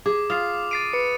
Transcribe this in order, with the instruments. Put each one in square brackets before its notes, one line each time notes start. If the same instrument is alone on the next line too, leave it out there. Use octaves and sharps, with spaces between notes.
[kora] G#4 [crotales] D6
[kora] F4 [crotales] D#6 C7
[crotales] A6 C7 D#7 [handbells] D7
[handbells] B4 [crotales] C#7